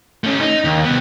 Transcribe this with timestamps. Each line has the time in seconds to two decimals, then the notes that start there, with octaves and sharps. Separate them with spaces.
0.24 A3 C#4
0.41 D#4
0.65 D#2
0.84 C2 B3